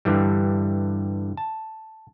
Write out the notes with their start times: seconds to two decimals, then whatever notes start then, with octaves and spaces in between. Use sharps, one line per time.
0.05 G2 D3 E3 G3
1.37 A5